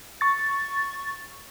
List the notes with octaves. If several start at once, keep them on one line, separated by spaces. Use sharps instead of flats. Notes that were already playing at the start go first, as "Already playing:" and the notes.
C#6 A6